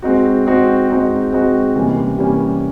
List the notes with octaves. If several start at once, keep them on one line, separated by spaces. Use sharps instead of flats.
G#3 C4 D#4 F#4
G#3 C4 D#4 F#4
G#3 C4 D#4 F#4
G#3 C4 D#4 F#4
C3 E3 G3 A#3 C#4
C3 E3 G3 A#3 C#4